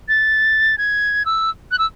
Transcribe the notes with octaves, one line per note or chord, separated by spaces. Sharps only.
A6
G#6
E6
F#6
E6